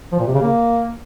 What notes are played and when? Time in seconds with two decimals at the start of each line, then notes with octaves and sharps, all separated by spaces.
0.12 F3
0.19 A#2
0.27 C3
0.34 C#3
0.42 A#3